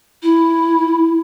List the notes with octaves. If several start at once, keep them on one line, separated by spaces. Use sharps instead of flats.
E4